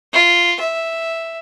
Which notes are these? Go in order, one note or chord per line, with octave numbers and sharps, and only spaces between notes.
F4
E5